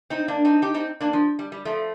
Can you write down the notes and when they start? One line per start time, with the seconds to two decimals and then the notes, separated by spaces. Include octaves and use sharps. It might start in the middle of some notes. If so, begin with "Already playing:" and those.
0.10 C4 D#4
0.28 A#3 D4
0.45 C4 D#4
0.62 D#4 G4
0.74 C4 D#4
1.01 A#3 D4
1.13 F3
1.39 G3
1.52 G3
1.65 F3 A3